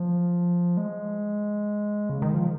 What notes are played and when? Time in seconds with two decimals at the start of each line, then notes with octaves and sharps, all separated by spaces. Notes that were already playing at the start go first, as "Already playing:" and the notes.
Already playing: F3
0.77 G#3
2.10 C#3
2.22 D#3
2.34 F3